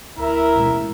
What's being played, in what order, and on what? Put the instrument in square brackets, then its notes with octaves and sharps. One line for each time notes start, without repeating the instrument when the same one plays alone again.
[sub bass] D2 [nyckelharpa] E4 A#4 [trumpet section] E5 A#5
[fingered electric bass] A1 B2 G#3